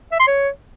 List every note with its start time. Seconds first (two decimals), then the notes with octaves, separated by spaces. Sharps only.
0.12 E5
0.20 C6
0.27 C#5